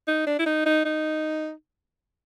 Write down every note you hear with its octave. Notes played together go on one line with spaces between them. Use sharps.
D#4
D4
E4
D#4
D#4
D#4